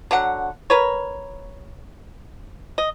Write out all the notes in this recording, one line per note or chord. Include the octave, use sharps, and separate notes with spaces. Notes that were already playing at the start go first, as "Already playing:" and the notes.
D3 F#3 F#5
A#4 B4 C#5
D#5